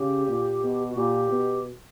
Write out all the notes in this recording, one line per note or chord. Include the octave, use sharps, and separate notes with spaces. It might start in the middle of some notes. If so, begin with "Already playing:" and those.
Already playing: C#3 G4
A#2
B2
F#4
A#2 G4
B2